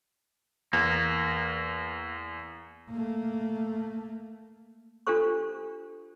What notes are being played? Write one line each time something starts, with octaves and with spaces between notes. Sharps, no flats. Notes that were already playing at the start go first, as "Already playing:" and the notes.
E2 A#3
A3 A#3
D4 F4 G4 A4 C5 C#6